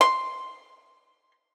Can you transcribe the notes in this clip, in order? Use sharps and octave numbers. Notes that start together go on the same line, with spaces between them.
C6